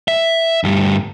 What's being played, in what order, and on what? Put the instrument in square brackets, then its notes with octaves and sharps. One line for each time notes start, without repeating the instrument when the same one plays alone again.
[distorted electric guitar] E5
D2 G2